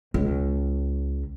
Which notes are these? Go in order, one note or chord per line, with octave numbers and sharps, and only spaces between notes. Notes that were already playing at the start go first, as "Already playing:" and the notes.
C#2